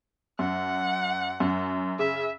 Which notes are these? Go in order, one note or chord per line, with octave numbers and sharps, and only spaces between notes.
F#2 F#5
F#2
C#3 E5